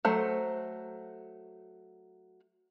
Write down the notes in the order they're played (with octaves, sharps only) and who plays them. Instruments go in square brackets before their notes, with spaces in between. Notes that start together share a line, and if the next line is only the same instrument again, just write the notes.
[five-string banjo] F#3 A3 C5